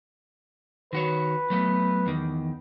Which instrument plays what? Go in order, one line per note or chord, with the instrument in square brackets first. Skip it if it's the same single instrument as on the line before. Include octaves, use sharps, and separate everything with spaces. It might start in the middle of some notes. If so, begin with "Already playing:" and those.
[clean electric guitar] D#3 F#4 C#5 [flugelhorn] B4
[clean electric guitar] F#3 A3 B3
E2 D#3